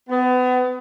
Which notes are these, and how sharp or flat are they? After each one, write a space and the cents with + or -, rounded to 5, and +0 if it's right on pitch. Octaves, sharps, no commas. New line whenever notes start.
B3 +30